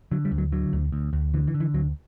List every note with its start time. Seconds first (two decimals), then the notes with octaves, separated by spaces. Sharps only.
0.11 D3 F#3
0.25 G3
0.32 D2
0.38 F#3
0.52 D3 F#3
0.73 D2
0.92 D2
1.13 D2
1.34 D3 E3
1.47 E3
1.54 D3
1.60 E3
1.74 D2 F#3